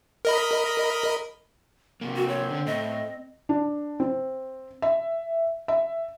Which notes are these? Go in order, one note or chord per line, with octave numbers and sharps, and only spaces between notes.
A#4 D#5 B5
C3 A#3 C4
F#4
C#5
D3
A2 D#5
D4
C4
E5
E5